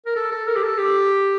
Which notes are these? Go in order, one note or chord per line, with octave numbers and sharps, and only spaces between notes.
A#4
A4
A4
A#4
G4
A4
G4